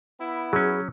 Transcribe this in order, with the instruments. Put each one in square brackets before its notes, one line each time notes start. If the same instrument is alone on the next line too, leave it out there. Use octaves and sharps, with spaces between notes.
[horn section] B3 E4
[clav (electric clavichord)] F#3 C#4 [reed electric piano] G#4